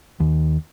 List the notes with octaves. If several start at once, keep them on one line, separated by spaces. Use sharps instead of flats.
D#2